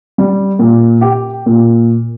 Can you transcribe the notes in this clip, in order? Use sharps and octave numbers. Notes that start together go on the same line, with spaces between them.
G3
A#2
G4
A#2